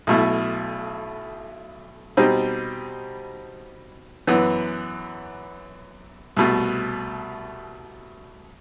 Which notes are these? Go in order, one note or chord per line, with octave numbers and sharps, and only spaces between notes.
B1 B2 A3 E4
B2 G3 C4 D#4
F#2 E3 B3
C2 B2 A3